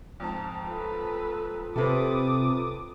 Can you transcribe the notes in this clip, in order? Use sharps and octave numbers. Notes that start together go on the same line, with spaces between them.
F2 G#2 A5
F4 A4 B4
C3 A4 B4 D6 D#6